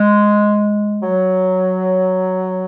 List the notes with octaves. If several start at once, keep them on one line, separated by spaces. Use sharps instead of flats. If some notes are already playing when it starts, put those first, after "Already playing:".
Already playing: G#3
F#3